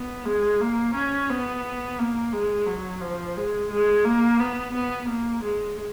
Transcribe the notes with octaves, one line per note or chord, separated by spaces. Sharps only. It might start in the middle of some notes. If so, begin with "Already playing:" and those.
Already playing: B3
G#3
A#3
C#4
B3
A#3
G#3
F#3
F3
G#3
G#3
A#3
B3
B3
A#3
G#3